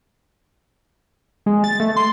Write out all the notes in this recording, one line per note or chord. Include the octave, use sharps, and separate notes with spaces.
G#3
A6
A3
C6